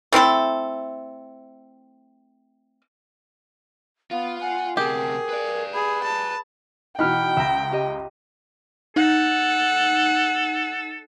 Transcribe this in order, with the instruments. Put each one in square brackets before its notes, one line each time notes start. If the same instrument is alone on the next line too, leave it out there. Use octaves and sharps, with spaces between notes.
[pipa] A3 C4 E4 A4
[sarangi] B3 [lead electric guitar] F4 [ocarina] F5
[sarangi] F#5 [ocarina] G#5
[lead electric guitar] D2 C3 [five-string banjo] G4 [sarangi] G#4 [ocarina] A#4
[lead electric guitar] B4 D5
[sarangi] G#4 [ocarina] B5
[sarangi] A5
[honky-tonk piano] B2 E3 D#4 [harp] F#5 B5 F6 [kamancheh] G5
[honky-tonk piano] C#2 [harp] E5 A#5
[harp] G4 D#5
[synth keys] D#4 [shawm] A4 [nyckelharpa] F#5